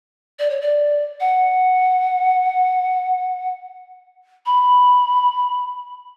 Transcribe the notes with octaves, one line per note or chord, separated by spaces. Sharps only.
D5
C#5
D5
F#5
B5